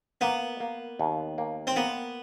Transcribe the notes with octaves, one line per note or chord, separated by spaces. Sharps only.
A#3 B3
A#3
D#2
A#3
C4
A#3 B3